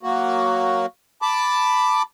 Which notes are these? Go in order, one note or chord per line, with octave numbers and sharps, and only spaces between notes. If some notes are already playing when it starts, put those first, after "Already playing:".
F#3 A#3 F#4
A5 B5 D6